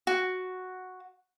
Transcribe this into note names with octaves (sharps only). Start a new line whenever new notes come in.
F#4